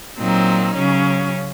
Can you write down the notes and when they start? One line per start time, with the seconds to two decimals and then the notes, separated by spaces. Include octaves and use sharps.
0.18 A#2 F#3 C4 D#4
0.75 C#3 F#3 C#4